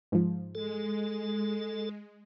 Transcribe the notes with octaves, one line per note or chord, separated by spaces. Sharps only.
G#2 F3
G#3 A4